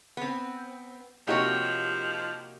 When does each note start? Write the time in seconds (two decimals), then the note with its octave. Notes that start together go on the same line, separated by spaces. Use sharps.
0.17 B3 C4
1.27 C3 F3 A#3 D#4 F#4 G4 C#5